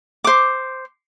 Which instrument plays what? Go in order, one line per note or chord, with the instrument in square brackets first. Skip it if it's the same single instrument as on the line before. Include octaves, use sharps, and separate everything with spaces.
[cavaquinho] C5 D6